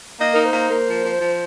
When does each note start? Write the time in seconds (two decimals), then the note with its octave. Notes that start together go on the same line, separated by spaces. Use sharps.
0.19 A#3 D#5
0.34 D#4 A#4
0.44 C5
0.53 A#3
0.70 A#3
0.86 F3
1.04 F3
1.21 F3